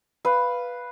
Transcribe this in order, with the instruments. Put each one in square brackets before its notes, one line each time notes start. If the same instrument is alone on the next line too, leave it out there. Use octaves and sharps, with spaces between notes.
[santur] B4 F5